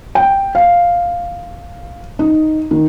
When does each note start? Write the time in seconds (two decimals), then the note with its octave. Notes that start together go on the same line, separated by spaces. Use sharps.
0.15 G5
0.55 F5
2.19 D#4
2.71 D#3